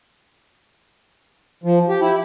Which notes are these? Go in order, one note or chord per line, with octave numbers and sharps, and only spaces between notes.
F3
G4
E4